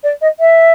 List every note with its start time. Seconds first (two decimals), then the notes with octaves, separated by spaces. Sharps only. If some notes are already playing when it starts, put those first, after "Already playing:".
0.03 D5
0.21 D#5
0.40 E5